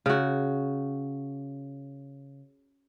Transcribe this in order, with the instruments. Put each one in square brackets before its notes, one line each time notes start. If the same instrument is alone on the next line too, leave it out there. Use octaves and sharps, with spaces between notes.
[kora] C#3 F#4